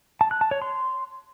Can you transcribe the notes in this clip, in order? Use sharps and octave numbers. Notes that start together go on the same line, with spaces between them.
A5
F#6
A5
C#5
C6